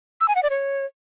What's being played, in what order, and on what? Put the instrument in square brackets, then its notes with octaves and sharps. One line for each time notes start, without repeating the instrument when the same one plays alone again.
[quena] E6
G#5
F#5
D5
C#5